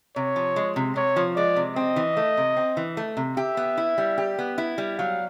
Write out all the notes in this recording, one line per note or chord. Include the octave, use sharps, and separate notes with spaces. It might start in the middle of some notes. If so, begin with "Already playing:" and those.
C3 C#5
F3
G#3
C3
C3 C#5
F3
G#3 D5
C3
C4 D#5
E3
A3
C3
C4
E3
A3
C3
G4 E5
B3
E4
G3
G4
B3
E4
G3
F#3 F5